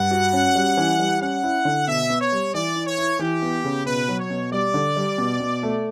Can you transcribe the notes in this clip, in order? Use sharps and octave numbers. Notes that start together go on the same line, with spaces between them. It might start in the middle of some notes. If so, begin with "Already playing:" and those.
Already playing: G2 F#5
F#4
C#4
G3
E3
G3
C#4 F#5
E4
D3
B2 E5
B3
C#5
G3
E3 D5
E4
C#5
E4
E3 G4
B3
C#3
B2 B4
F#3
C#5
B2
G3 D5
D3
G3
B2
B2
A3